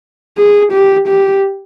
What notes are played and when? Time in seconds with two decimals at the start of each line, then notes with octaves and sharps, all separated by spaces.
0.38 G#4
0.73 G4
1.08 G4